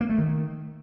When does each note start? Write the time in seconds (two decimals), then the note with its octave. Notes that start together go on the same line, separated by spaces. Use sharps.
0.01 A#3
0.09 A3
0.18 D#3